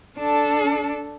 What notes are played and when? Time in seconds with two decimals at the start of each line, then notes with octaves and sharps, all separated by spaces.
0.18 D4 A4